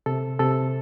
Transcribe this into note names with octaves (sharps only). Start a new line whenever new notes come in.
C3 A4
C3 A4